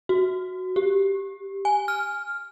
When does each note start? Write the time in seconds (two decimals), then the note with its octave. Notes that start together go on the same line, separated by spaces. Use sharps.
0.09 F#4
0.76 G4
1.65 G#5
1.88 F6